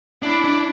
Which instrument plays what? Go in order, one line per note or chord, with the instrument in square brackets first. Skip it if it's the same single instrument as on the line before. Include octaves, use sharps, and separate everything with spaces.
[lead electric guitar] D4 [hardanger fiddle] E4
[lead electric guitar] D4